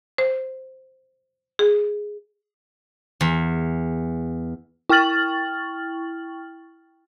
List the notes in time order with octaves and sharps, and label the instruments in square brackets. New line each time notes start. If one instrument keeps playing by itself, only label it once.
[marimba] C5
G#4
[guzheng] E2
[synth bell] E4 G5 C#6 F6 A6 F#7